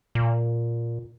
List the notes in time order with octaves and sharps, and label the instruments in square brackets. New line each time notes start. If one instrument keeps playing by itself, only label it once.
[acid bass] A#2